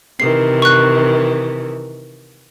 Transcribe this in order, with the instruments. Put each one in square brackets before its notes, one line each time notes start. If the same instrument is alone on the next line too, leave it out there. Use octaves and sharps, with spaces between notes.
[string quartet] C3 D#3 E3 [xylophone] C7
[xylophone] C#6 F#6